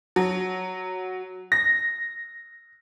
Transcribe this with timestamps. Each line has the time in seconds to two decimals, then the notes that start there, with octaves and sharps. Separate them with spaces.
0.16 F#3
1.52 A#6